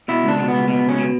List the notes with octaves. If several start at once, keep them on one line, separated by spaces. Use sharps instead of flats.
B2 E4
C#2 D4
B2
C#2 B3
B2 B3
C#2
C#4
B2